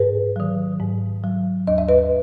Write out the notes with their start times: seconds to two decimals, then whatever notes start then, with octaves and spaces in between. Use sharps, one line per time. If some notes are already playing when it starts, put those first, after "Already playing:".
Already playing: G#2 G#4 B4
0.36 D#3 F#3
0.80 G#2
1.24 F#3
1.67 D#2 D#5
1.78 E5
1.88 B4 D#5